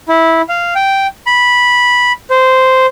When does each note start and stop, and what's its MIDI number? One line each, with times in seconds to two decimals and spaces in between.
0.08 0.42 64
0.49 0.74 77
0.75 1.07 79
1.27 2.12 83
2.30 2.86 72